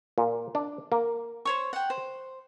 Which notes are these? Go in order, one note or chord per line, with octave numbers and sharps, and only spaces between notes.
A#2
D4
A#3
C5 C#5 C#6
F#5 G5
C5